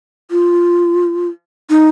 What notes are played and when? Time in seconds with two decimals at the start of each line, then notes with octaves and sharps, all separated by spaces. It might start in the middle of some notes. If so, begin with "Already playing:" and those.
0.31 F4
1.70 D#4